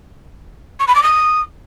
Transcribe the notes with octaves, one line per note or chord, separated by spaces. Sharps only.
C#6
B5
D6
D#6